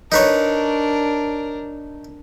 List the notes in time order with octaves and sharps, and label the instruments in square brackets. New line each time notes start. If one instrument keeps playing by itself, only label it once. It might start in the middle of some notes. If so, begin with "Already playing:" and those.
[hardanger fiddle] D4 A#4 [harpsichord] D#4 B4 C#5